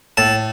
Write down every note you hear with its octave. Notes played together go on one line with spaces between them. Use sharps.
A2 A5